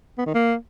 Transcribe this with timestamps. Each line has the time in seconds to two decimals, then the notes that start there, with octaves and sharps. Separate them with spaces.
0.18 B3
0.26 D#3
0.35 A#3